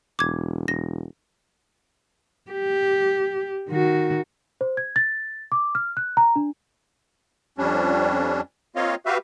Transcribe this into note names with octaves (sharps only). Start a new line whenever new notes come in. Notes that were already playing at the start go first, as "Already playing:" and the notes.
E1 D6 G#6
E1 A#6
G4
D#3 F#4
C5
G#6
A6
D6
F6
F#6
A#5
D4
F2 G3 C#4 D4
A#3 C4 F4 C#5 D#5 F5
F#4 G4 B4 E5 F5